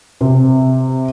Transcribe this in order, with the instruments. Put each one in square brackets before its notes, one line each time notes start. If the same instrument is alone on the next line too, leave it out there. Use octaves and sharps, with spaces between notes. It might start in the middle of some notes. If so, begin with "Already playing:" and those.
[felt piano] C3